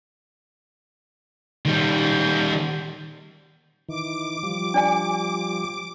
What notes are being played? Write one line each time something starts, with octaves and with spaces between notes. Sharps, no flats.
D#3 G3
D#3 E3 D6
F3 G3
D4 D5 G#5